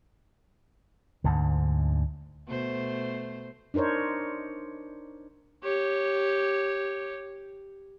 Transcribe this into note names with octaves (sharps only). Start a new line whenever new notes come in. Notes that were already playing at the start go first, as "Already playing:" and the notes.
D2 G#2 D3
B2 A3 C5
D4 D#4 A#4 C5 C#5
G4 C#5